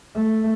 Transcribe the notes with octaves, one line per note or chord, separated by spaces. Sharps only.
A3